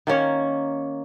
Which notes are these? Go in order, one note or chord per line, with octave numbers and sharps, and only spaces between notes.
D#3 A#3 C#4 C#5